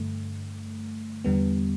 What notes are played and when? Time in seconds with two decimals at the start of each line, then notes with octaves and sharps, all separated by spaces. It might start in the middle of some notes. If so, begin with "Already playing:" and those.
Already playing: G2 D3 A3
1.25 E2 D3 G3 B3